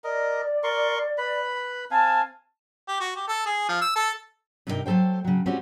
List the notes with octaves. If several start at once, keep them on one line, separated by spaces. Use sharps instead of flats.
A#4 D5 D#5
A#4 C6 C#6
B4 B5
C4 F5 G#5 A5
G4
F#4
G4
A4
G#4
F3
E6
A4
G2 C3 D#4 E4 A#4 G5
F#3 A3 A4 C5 G5
C#3 F#3
G3 G#3 C4 C#4 F4 F#4